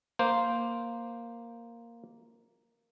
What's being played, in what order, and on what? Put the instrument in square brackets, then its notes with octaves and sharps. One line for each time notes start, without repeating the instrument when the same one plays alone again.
[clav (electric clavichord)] A#3 C5